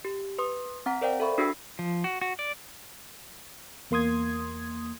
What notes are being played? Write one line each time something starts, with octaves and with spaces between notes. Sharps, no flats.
G4
B4 C6 D#6
C4 F#5 A#5 B6
A#4 C5 D5 F5 G5
A4 E5 B5 C#6
D4 F#4 G#4 B5 E6 C7
F3
F#4
F#4
D5
E2 A#3 C6 D#6 G#6